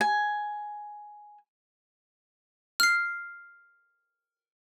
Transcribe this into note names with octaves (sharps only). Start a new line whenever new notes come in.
G#5
F6 C7